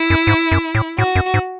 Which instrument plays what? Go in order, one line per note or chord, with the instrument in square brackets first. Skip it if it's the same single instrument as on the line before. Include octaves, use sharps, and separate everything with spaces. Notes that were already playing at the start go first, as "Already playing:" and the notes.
Already playing: [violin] E4
[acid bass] F#2
G#2
F#2
A2
[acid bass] A2 [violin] F#4
[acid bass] F#2
G#2